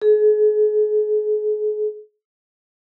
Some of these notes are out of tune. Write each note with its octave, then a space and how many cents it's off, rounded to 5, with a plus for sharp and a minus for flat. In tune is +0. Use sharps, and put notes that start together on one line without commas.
G#4 +40